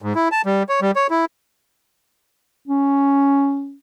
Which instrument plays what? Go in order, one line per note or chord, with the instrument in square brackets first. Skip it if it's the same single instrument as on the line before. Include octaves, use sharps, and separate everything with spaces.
[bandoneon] G#2
E4
A5
G3
C#5
G3
C#5
E4
[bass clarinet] C#4